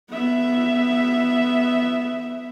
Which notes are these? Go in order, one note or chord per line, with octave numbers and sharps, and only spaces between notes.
B3 E5